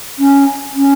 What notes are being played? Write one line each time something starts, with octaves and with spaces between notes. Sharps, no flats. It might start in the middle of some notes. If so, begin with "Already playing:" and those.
C#4
C#4